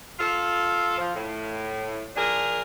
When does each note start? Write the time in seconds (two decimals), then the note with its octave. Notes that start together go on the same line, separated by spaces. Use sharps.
0.19 F4 A4
0.98 F3
1.16 A2
2.16 F3 D4 G#4 A#4